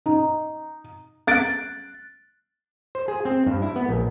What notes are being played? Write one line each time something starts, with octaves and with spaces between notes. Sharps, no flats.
D#4
F#6 A6 D7
C5
G#4
C4
G2
E4
B3
A#1